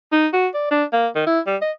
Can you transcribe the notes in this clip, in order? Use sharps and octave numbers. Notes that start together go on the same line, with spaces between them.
D#4
F#4
D5
D4
A#3
D#3
E4
G3
D#5